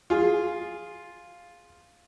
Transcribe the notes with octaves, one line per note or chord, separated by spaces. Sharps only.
F4 G#4